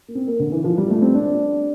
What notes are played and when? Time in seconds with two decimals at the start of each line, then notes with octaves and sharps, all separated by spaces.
0.08 A#3
0.15 C4
0.28 A#3
0.40 D3
0.52 E3
0.64 F3
0.77 G3
0.90 A3
1.02 C4
1.15 D4